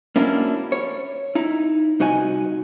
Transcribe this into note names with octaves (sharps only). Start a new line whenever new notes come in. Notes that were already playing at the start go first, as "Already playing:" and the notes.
A#3 C#4 D4 E4 F#4
C#5
D#4 E4
C2 D#4 F#4 D#5 G#5